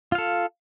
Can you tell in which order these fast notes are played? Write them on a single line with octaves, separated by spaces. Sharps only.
F4 F5 A4